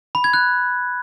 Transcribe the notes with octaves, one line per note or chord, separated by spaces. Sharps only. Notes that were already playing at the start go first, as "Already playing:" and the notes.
B5
G#6
F#6